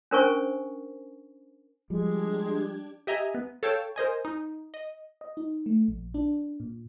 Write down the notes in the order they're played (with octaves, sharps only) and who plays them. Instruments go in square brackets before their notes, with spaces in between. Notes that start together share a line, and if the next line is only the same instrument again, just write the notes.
[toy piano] C#4 D4 A#4 C5 G#5 C#6
[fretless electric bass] F3 G3 [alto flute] G#3 [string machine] D4 G4 G#6
[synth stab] G4 D#5 E5 G#5 A#5
B3
A4 C#5 F5 G5 A5
A#4 C5 D#5 G#5
D#4
D#5
[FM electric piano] D#5
D#4
A3
A#1
D4
A#2